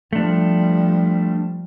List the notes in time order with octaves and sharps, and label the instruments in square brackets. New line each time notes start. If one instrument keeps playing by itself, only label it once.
[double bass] F3 G3 [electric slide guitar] A3 D4